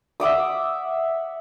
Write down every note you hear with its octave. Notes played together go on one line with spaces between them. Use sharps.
E5 F#5 D6 D#6